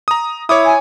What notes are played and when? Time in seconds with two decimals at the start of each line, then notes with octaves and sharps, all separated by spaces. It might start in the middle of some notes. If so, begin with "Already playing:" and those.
0.08 A#5 D#6
0.49 E4 C#5 D6 D#6
0.65 G#5